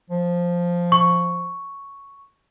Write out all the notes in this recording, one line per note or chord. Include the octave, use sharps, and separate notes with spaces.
F3
C#6